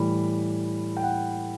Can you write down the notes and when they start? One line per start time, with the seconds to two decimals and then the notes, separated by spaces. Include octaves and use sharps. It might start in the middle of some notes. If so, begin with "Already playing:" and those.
Already playing: A2 E3 G3 B5
0.97 G5
1.03 F#5